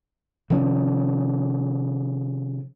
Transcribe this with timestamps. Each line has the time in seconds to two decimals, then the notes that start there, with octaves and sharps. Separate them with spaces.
0.50 C3 D#3 F3 C#4